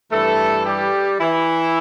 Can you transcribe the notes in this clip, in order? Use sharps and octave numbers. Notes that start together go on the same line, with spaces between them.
G2 E3 A3 A4
G3 G4
E3 E4